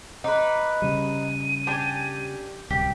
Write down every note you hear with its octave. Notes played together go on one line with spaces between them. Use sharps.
D#4 B4 D6
C#3 G3 D#7
D4 G4 G#5
D1 C2 G4